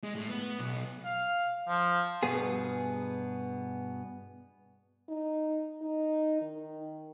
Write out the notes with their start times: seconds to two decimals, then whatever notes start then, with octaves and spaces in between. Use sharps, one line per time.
0.03 G#3
0.15 A2
0.29 B3
0.60 B1
1.05 F5
1.68 F3
2.23 G2 B2 B3 G#4
5.09 D#4
5.82 D#4
6.41 D#3